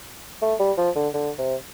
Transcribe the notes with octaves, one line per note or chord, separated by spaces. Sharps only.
A3
G3
F3
D3
D3
C3